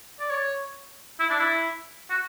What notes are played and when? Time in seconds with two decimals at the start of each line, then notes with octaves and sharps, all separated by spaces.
0.20 D5
0.30 C#5
1.20 E4
1.30 D4
1.39 E4
2.10 F#4